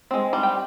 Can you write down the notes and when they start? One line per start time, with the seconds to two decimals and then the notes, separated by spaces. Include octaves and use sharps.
0.11 G#3 C4
0.33 G3
0.43 G5